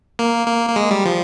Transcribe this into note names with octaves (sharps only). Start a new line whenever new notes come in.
A#3
A#3
A#3
G#3
G3
F3